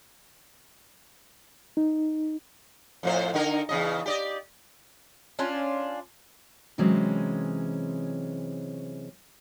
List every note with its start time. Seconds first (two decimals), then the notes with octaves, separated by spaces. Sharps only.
1.77 D#4
3.03 F2 A2 C5
3.34 D3 D#4 A#4
3.69 E2 C#3 D#5
4.06 G4 D5 D#5
5.39 C#4 D4 F4
6.78 C3 E3 F#3 G#3 C4 C#4